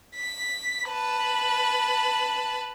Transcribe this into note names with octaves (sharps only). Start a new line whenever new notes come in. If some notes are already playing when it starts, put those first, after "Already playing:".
B6
B4 A5